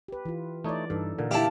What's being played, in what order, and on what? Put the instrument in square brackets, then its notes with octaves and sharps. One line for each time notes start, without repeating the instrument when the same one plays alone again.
[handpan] G4 B4
E3 F4
[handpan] E3 D5 [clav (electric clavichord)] A3 D#4 C#5
[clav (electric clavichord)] G2 [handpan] E3 D#4 A4
[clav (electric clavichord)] A#2 D3 [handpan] A#3 A#4
[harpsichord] E4 G4 [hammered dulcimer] F5 A5